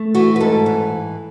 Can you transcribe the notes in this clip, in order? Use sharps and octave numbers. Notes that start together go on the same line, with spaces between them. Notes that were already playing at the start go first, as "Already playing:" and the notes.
Already playing: A3
E3 F#4
B4
G#2 A4
E3